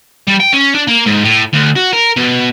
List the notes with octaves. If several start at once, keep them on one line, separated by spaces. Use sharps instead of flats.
G3
G5
C#4
D4
A#3
G#2
A2
D2
F#4
A#4
B2